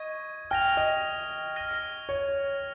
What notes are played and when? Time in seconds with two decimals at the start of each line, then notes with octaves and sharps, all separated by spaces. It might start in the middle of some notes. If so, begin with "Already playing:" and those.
Already playing: D#5 C#6 G#6 D#7
0.51 G5 F6 A#6 F7
0.77 D#5
1.56 F6 A#6 D#7 G7
2.09 C#5